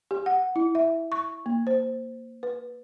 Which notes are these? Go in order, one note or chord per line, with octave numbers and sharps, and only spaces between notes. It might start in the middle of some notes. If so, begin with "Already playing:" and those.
G4
F#5
E4
E5
C#6
A#3
C5
B4